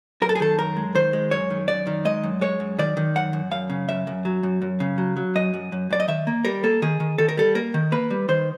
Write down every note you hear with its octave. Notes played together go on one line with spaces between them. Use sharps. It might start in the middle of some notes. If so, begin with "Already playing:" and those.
F#2 A#4
A4
G#4
D#3 A4
F#2 A#4
G#3
D#3 C5
G#3
F#2 C#5
D#3
F#2 D5
D#3
G#3 D#5
F#2
G#3 C#5
F#2
D#3 D5
D#3
F#2 F#5
F#2
F#2 F5
C#3
F#2 E5
F#2
F#3
F#2
F#2
C#3
F#3
F#3
F#2 D#5
F#2
F#2
F#2 D5
D#5
D#3 E5
A#3
G3 A#4
A#3 A4
D#3 G#4
D#3
D#3 A4
A#4
G3 A4
A#3 A#4
D#3
A#3 B4
G3
D#3 C5